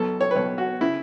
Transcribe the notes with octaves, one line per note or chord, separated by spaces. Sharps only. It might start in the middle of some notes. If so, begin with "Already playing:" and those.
Already playing: B1 B2 A4
C#5
B4
B1 B2 C#5
F#4
C#3 E4